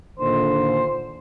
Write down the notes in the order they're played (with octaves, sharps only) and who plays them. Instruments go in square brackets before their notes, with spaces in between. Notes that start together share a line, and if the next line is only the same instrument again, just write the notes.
[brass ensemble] A#2 D3 D#3 [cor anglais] C5